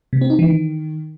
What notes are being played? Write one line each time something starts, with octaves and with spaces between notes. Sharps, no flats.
C3
C4
D#4
E3
D#3